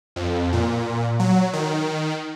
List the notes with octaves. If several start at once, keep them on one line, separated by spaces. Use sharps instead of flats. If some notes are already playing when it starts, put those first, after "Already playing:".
F2
A#2
F#3
D#3